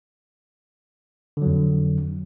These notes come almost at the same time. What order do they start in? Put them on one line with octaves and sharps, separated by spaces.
D3 F#3 F2